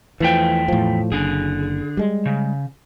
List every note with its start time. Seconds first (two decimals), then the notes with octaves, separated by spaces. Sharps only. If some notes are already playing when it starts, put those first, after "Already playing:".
0.20 E2 E3 F3 A3 G5
0.68 A2 F3
1.12 F#1 D3 G#4
1.97 G3 G#3
2.26 C#3